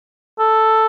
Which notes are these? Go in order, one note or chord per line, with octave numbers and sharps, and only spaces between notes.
A4